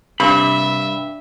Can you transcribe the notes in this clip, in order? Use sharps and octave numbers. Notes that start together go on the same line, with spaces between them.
G2 C3 E5 B5 B6